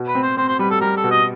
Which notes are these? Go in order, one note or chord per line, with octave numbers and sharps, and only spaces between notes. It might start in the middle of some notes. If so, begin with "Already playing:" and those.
Already playing: B2
B4
C4
C5
C4 C5
C5
G3 B4
A4
G3 A#4
A4
B2
D#5